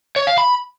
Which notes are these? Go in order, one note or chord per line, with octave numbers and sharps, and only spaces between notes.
C#5
F5
B5